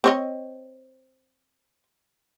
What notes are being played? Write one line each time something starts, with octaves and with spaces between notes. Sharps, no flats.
C4 C#5 D#5